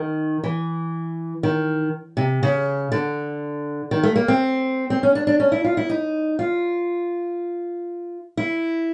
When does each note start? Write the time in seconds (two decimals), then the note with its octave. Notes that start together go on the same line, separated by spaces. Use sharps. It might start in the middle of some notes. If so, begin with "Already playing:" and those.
Already playing: D#3
0.43 E3
1.43 D#3
2.17 C3
2.43 C#3
2.92 D3
3.91 D#3
4.03 A3
4.16 A#3
4.28 C4
4.90 C4
5.03 C#4
5.15 D4
5.27 D4
5.40 C#4
5.52 E4
5.65 F4
5.77 E4
5.89 D#4
6.39 F4
8.37 E4